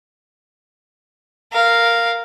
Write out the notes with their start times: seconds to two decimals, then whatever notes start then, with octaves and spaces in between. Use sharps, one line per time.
1.53 A#4 F5